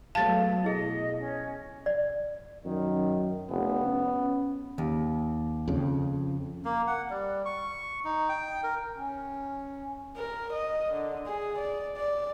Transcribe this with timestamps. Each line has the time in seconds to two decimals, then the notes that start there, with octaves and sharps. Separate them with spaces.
0.15 F#3 A3 B3 F5 A5 A6
0.64 B2 E4 G#4 D#5
1.19 C#4
1.86 D5
2.65 F#2 D#3
3.50 F1 B3
3.86 C#4
4.78 D#2
5.68 F2 C#3
6.65 A#3
6.87 F#5
7.10 G3
7.45 C#6
8.04 D#4
8.29 G5
8.63 A#4
8.96 C#4
10.16 A#4
10.53 D#5
10.93 D3
11.26 G#4
11.59 D5
11.97 D5